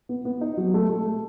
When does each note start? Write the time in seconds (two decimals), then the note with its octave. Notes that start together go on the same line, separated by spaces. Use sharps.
0.09 B3
0.25 B3
0.41 D#4
0.57 F#3
0.74 A3
0.90 A3
1.06 A3